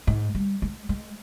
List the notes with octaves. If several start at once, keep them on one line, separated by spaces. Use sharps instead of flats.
G#2
G3
G#3
G#3